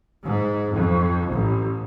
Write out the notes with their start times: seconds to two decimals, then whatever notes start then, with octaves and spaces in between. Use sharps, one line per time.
0.23 G#2
0.72 F2
1.30 A1